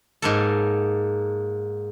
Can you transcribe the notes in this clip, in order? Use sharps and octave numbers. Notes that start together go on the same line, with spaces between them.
G#2 A#3 A4